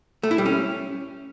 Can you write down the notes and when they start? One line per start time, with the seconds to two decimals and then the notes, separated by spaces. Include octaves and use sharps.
0.23 A3
0.31 E4
0.38 G3
0.46 C#4